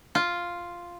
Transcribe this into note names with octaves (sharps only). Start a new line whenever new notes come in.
F4